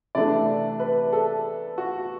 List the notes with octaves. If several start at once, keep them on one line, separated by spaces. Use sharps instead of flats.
C3 E3 A3 D4 D5
B4
A4
F#4